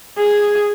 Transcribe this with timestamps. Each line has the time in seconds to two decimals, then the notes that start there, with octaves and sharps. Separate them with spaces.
0.18 G#4